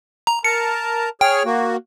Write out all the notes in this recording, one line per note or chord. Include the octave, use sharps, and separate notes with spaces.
A#5
A#4 A5 A#5 C#7
G#4 C#5 G5 F6
A#3 F#4